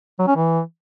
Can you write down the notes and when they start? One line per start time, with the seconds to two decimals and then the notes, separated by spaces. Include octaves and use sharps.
0.19 F#3
0.28 C#4
0.36 E3